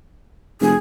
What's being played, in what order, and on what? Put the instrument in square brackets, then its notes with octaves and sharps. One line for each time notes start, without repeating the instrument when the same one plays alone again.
[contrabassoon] F1 [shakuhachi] G#4